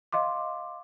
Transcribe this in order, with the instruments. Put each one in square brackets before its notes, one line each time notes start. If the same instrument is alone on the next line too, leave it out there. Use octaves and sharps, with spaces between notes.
[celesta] D#5 F5 C6 D6